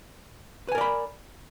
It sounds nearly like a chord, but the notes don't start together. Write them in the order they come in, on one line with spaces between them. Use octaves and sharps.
B4 G#5 A#4 D5 B5